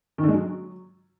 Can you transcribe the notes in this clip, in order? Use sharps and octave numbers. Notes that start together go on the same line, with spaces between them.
D#3
D3
G#3
F#3